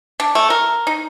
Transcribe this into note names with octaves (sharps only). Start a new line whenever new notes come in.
D4
A3
A#4
D#4